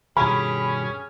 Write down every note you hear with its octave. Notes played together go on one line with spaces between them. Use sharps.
G2 B2 D#3 C#4 G4 G#4 B5